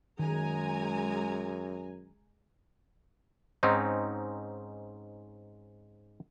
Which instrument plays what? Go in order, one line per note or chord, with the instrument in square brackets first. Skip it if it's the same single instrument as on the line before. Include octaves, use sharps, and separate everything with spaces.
[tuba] F#2 [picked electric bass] D#3 [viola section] G#3 G#5 A#5
[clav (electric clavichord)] G#2 C4 C#4 D#4